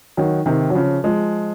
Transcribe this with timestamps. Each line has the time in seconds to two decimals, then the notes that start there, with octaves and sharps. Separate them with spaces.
0.17 D#3 F#3
0.46 C3 D#3
0.70 F#3
0.75 C#3 F3
1.04 F3 G#3